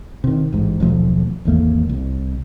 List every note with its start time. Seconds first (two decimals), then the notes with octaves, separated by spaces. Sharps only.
0.24 C3 D#3
0.53 A1 G#2
0.80 D#1 B1 F3 A3
1.45 G#1 E2 A3 A#3
1.89 C2